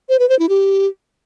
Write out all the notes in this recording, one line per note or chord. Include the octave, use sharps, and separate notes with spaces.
C5
B4
C5
E4
G4